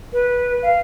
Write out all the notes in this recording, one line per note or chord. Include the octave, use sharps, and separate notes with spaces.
B4
F5